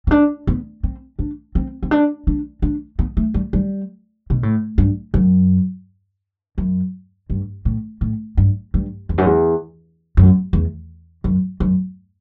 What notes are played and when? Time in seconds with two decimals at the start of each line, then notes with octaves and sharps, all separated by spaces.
0.07 C4
0.11 D4
0.47 B3
0.83 C4
1.19 D4
1.55 C4
1.83 C4
1.91 D4
2.27 D4
2.62 D4
2.99 B3
3.17 A3
3.34 G3
3.53 G3
4.30 B2
4.43 A2
4.78 G2
5.14 F#2
6.58 F#2
7.30 G2
7.65 A2
8.01 A2
8.37 G2
8.74 G2
9.09 E2
9.18 F#2
9.26 E2
10.17 F#2
10.53 E2
11.24 F#2
11.60 F#2